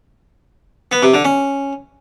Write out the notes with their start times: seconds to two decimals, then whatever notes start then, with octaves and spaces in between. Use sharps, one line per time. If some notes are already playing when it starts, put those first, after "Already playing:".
0.92 B3
1.03 C3
1.14 D3
1.25 C#4